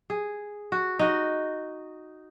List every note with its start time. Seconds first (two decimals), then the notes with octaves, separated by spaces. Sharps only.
0.10 G#4
0.72 F#4
0.99 D#4 F#4